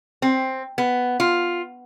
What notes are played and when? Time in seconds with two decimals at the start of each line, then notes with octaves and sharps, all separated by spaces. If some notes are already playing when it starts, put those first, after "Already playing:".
0.22 C4
0.78 B3
1.20 F4